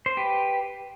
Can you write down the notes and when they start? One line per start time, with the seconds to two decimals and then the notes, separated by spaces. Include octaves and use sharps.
0.06 C5
0.17 G4 B4